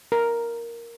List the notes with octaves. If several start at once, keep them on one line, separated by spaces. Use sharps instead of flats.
A#4